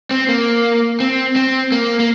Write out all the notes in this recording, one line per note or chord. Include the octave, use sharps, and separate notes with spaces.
C4
A#3
C4
C4
A#3
A#3